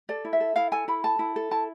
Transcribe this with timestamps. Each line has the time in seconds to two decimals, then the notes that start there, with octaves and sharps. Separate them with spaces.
0.09 A4 D5
0.25 E4
0.33 E5
0.40 A4
0.56 E4 F5
0.72 A4 G#5
0.88 E4 B5
1.04 A4 A5
1.19 E4
1.36 A4
1.51 E4 A5